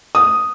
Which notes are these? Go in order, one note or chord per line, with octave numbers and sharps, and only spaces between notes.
D#6